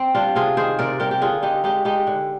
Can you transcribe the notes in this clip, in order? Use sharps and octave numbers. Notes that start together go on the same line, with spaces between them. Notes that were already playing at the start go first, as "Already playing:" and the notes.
Already playing: C4
G3 D4 F4
C3 F4 G#4
D#3 G#4 C5
C3 A#4 D5
G3 G4 A#4
G4
D3 F4 G#4
D3 D#4 G4
G#3 D#4 G4
G#3 D#4 G4
D3